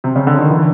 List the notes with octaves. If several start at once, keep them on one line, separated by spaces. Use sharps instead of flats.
C3
C#3
D3
D#3
D3 E3